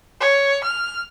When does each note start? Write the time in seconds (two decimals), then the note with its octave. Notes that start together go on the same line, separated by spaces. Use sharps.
0.21 C#5
0.64 F6